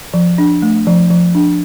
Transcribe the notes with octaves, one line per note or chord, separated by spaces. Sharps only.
F3
D4
A3
F3
F3
D4